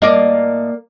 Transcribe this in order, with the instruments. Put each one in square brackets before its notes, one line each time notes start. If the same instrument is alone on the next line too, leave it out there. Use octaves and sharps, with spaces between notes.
[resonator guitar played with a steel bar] A2 D#5 [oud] A#3 D5